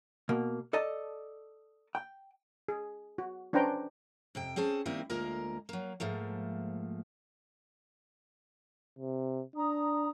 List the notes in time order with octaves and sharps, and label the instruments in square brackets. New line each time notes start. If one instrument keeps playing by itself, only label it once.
[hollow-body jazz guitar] B2 A#3
A4 D5 D#5 A5
G5
[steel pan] G#4
F#4
C#4 D4 B4 C5 G5 A#5
[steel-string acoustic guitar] F2 C3 G5
C4 C#4 G#4 C5 A5
D#3 G3 A#3 C4 D#4 E4
D2 G#3 A#3 F4 A#4 A#5
F#3 A#3
G#2 F3 A3 A#3
[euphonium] C3
[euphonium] D4 [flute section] A#5 D#6